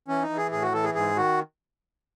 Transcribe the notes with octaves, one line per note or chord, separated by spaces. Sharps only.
E3 C#4
D#4
E3
G#4
A2 G#4
F#4
E3 A4
G#4
G#2 G#4
D#3 F#4